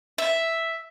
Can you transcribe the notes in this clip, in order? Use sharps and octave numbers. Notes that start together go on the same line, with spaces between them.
E5